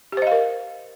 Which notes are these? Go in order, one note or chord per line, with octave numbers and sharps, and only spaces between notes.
G4 A#4 C5 D#5 F5